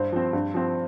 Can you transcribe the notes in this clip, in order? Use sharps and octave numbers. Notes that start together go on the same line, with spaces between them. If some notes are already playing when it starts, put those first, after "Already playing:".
Already playing: G2 C5
F3 C4
G2
F3 C4